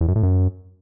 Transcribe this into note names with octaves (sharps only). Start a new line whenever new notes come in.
E2
F#2
A2
F#2